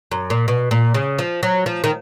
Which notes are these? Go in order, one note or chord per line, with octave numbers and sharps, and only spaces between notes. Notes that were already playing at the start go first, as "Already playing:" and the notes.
F#2
A#2
B2
A#2
C#3
F3
F#3
F3
D#3